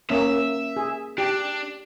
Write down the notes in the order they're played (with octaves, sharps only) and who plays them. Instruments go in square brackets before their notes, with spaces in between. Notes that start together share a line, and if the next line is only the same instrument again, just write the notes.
[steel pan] A#3 C#4 [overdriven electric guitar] E5
[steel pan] G#4
[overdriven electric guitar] D4 [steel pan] G4